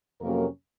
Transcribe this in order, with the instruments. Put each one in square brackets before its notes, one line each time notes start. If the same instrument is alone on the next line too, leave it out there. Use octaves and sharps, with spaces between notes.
[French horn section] F2 C3 F#3 A#3 C#4 A#4